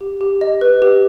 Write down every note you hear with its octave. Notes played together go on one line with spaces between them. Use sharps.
G4
G4
D#5
B4
G4